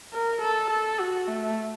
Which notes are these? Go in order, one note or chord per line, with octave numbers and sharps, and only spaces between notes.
A#4
A4
A4
F#4
A3